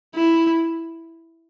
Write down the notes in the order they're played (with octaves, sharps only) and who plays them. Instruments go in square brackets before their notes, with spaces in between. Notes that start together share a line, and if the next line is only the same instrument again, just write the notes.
[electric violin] E4